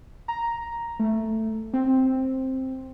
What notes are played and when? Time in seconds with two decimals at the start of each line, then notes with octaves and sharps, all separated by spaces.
0.28 A#5
0.99 A3
1.73 C4